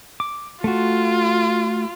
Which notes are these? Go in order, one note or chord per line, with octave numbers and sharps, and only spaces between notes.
D6
A3 F4 F#4